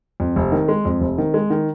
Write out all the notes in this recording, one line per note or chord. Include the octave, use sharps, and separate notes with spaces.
F2
F1
D#3
G#3
F2
F1
D#3
G#3
D#3